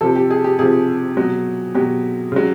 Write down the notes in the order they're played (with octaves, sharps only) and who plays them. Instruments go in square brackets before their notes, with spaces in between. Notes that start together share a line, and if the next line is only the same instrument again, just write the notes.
[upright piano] C3 F3 A4
G4
G#4
G4
C3 F3 G#4
B2 F#3
B2 F#3 G4
C#3 F#3